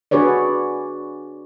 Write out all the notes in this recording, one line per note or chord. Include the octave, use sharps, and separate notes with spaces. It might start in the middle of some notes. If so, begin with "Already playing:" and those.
D4 F#4 G#4 B4 C#5 D5